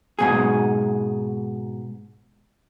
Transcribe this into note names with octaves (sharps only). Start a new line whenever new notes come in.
G#2 B2 G#4